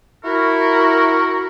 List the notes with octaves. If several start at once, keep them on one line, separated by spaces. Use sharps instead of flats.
E4 F#4 A#4